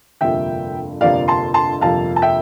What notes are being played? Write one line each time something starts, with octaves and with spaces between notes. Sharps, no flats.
G1 F2 C3 F3 A#3 E5 G5
G1 F2 C3 F3 A#3 D5 F5
A5 C6
A5 C6
G1 F2 C3 F3 A#3 F5 A5
A5
E5 G5